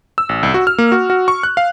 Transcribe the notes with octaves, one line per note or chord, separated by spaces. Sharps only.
E6
A1
C2
F#4
F6
A#3
F#4
F#4
C#6
F#6
F5